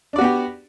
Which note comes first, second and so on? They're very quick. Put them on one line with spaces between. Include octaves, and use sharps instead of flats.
D4 D5 F#4 B3 G4